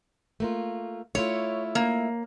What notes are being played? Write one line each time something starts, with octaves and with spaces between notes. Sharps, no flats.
A3 A#3 F4
A3 E4 F4 C#5
A#3